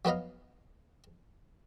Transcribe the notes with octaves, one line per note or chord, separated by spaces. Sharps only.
F#3 B3 B4 D#5 F5